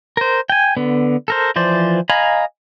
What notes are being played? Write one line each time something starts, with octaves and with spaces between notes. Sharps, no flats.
A#4 C5
G5 G#5
D3 B3
A4 A#4 C5
E3 F3 C5 D5
D#5 F5 G#5 A#5 B5